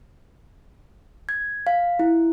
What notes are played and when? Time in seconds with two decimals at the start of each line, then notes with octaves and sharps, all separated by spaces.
1.29 G#6
1.67 F5
1.99 E4